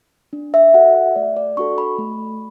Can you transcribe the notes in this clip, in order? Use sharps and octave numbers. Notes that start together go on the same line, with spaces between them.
D4
E5
F#4 A4 F#5
E5
A3 D5
D5
D4 F#4 A4 C#6
B5
A3